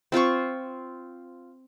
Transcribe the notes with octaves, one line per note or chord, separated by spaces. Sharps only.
C4 F4 C5 C#6